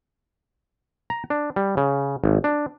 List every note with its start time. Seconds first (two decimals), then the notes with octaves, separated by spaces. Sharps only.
1.10 A#5
1.30 D4
1.56 G3
1.77 C#3
2.24 G#1
2.44 D4